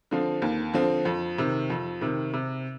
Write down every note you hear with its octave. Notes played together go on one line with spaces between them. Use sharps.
D3 F3 C4
D#2
D3 F3 C4
F2
C3 D#3
F2
C3 D#3
C3